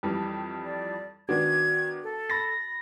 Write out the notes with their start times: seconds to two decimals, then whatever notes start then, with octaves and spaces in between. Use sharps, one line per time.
0.03 F2 E3 G3
0.64 D5
1.29 D#3 B3 D4 F#4 G#6
2.03 A4
2.30 B5 A6 A#6